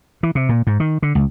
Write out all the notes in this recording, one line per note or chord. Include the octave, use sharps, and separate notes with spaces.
E3
C3
A#2
G#2
D#3
D3
C#2